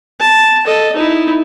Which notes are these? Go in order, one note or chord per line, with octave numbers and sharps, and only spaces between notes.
A5
A4 D#5
D#4 E4